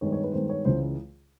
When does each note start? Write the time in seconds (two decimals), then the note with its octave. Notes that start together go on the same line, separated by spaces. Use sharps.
0.01 G2 D#3 G#3 B3 C#5
0.12 C#5
0.24 B4
0.33 G2 D#3 G#3 B3 C5
0.49 C#5
0.65 C#2 C#3 E3 C5